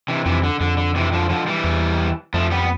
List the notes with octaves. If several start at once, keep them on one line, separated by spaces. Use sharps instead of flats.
C3 E3
F2 C3 E3
D3
F2 D3
D3
C3 E3
D3 F3
D3 F3
E3 G3
E2
F2 F3 A3
G3 B3
B3